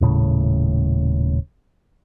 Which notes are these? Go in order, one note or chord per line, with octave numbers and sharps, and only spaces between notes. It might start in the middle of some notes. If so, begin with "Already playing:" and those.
D#1 A2 C#3